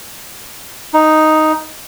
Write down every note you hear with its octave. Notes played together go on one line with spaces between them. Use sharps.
D#4